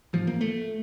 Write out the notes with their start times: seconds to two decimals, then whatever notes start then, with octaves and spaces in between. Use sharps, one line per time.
0.13 A1 G#2 F3
0.27 A#3
0.41 A3